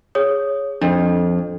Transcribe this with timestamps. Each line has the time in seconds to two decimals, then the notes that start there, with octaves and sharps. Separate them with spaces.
0.15 G#4 C#5 D#6
0.81 F2 D4